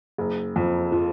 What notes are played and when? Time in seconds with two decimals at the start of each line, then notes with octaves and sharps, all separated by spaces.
0.18 F#1
0.56 F2
0.92 F3